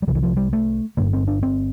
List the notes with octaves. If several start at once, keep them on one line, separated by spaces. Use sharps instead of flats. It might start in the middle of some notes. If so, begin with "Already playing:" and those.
G3
C2 C3 F3
E3
F3
G3
A3
G1 G2 D3 A#3
C4
D4
C4